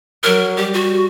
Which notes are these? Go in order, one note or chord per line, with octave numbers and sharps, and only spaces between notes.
F#3 A#4
G3 G4
F#4